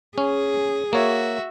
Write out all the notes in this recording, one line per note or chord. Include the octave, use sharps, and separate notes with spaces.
C#4 G#4
A#3 F#4 C#5 E5